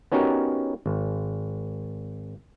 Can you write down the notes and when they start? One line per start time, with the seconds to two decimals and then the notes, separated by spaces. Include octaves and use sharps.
0.12 B3 C#4 D#4 F#4 G4 A#4
0.86 G#1